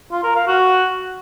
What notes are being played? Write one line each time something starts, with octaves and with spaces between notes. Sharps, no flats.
F4
A#4
F5
F#4